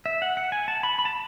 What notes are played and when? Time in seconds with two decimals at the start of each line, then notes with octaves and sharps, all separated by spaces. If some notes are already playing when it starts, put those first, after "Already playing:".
0.06 E5
0.22 F#5
0.37 F#5
0.52 G#5
0.68 A5
0.83 B5
0.99 B5
1.05 A5